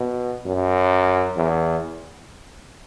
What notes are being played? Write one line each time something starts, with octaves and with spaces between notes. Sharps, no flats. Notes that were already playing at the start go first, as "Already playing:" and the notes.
Already playing: B2
F#2
E2